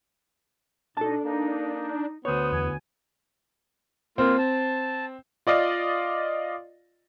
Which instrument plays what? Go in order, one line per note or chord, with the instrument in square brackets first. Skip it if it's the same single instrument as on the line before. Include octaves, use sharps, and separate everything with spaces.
[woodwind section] B2 D#4 [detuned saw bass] D4 [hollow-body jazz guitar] A4 A5
[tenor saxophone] A#3 [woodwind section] D#4
[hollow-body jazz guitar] D2 C#5 [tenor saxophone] B3 [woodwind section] C5 C6 D#6
[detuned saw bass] E2 [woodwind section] G#5
[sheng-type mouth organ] A#3 F4 [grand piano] C4
[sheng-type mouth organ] A5
[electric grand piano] F4 D5 D#5 F5